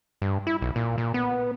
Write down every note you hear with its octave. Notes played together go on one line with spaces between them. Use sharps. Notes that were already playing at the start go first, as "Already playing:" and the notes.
G2
E4
B1
A#2
A#2
B3